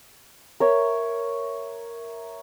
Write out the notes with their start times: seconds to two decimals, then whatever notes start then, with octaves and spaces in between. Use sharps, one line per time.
0.60 A#4 C#5 E5